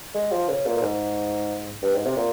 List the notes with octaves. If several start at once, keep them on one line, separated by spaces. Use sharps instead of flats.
G#3
F3
C#3
A#2
A#2
G#2
G2
G#2
C3
A#2